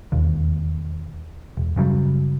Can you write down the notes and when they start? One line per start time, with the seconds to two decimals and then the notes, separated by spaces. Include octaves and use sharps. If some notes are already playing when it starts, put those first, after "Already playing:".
0.12 E1 D#2
1.57 E1
1.76 F#1 C#3 F#3 G3